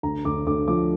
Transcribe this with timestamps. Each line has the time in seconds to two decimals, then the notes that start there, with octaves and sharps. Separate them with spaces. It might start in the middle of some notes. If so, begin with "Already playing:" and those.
0.03 D2 A#5
0.25 D2 D6
0.47 D2 D6
0.68 F3 D6